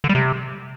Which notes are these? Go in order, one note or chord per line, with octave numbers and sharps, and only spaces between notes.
D3
G3
C3